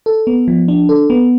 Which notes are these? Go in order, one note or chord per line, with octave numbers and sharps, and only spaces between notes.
A4
B3
F3
D4
A4
B3